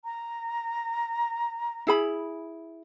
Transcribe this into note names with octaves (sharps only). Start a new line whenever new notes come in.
A#5
E4 G#4 B5